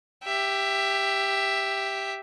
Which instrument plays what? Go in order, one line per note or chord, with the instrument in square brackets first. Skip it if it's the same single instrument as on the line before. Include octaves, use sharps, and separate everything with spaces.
[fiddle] G4 E5